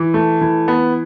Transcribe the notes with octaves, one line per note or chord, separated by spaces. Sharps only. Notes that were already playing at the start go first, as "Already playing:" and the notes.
Already playing: E3
A3
E3
B3